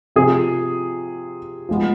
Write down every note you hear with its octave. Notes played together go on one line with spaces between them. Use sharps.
C3 F3 C4 G#4
F3 G#3 B3